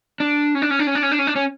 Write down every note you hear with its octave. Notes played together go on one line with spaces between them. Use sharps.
D4
C#4
D4
C#4
D4
C#4
D4
C#4
D4
C#4
D4
C#4